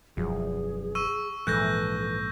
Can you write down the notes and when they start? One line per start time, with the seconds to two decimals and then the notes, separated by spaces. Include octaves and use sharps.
0.17 E1 F#2 F3 G#4
0.95 C#6 E6 D#7
1.47 A#1 G#2 E3 A4 F#6 G6 A#6